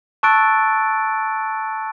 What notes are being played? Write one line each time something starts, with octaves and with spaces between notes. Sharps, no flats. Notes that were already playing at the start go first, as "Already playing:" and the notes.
A5 C#6 E6 F#6 A6 D7